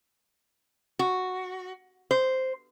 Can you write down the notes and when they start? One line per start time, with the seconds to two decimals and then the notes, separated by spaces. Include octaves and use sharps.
0.99 F#4
2.11 C5